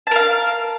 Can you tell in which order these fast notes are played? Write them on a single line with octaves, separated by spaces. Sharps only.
A5 A#4 F5